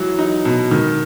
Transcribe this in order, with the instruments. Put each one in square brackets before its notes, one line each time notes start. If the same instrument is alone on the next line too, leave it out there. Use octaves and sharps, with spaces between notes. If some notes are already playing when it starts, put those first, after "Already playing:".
Already playing: [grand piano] E3 F#3
D#4
B2
D#3